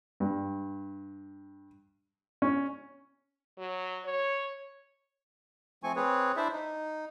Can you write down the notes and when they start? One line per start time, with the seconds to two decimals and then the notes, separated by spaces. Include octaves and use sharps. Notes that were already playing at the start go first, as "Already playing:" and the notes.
0.20 G2
2.42 C#4
3.58 F#3
4.05 C#5
5.83 F3 A3 C4 G#5 C#6
5.96 C4 G#4 B4 C#5
6.37 D4 E4 C5 D5 E5
6.52 D#4